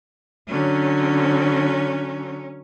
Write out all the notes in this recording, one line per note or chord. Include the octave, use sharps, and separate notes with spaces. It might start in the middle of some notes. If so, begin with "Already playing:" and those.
D3 F#3 C#4 C#5